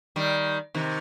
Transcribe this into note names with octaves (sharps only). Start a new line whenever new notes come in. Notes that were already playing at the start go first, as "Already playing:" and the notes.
D#3 G3
C3 D#3